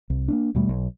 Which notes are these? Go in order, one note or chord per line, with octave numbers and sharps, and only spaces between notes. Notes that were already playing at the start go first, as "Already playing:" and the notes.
C2
A#3 C#4 D4
D#2 B2 G3 A3
B1